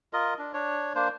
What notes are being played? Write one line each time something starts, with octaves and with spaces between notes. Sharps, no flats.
F4 A#4 D#5
D4
D4 C#5
A#3 D4 C5